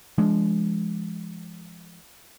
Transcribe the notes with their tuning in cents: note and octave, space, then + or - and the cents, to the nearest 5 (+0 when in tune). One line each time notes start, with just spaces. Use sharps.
F3 -35 G#3 +0 D4 -15